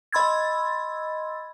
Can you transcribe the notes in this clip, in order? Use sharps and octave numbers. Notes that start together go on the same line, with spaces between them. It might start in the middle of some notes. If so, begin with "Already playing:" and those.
D#5 B5 C6 E6 G#6 A6